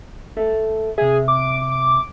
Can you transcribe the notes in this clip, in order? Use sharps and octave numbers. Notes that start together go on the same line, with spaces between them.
A4 E5
C3 G#4 E5
D6